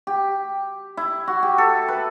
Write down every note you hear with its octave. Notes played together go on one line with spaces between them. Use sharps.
G4
E4
F#4
G4
A4
B4